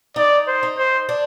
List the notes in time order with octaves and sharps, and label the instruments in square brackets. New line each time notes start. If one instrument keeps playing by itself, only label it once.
[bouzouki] D#4 [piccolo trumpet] D5
[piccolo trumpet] C5
[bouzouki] D#4
[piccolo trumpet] C5
[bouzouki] D4